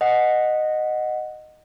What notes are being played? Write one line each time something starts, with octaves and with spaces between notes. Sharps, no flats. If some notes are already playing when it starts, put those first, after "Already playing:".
D#5 F#5